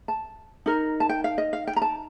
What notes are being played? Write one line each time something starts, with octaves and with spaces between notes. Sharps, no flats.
A5
D#4 A#4
A5
G5
F5
D#5
F5
G5
A#5
A5